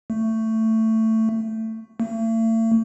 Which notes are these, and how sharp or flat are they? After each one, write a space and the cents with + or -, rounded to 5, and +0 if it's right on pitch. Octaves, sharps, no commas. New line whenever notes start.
A3 +15
A3 +40